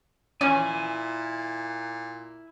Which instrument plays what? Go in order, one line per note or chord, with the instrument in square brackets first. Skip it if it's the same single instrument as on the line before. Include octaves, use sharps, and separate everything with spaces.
[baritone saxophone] A#2 [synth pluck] C#4 [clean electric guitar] E4 G#5